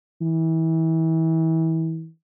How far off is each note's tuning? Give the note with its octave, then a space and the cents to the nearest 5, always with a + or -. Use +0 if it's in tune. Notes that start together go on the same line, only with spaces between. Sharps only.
E3 -30